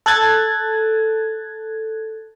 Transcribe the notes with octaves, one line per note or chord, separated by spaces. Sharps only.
A4 F#6 G#6 A6